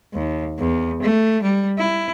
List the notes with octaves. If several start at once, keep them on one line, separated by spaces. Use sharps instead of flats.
D#2
E2
A3
G3
E4